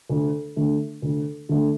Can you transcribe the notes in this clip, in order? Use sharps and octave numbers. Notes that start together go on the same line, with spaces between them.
D2
D3 A3
D2
D3 A3